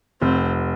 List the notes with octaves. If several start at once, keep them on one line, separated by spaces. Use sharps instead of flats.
F1 C4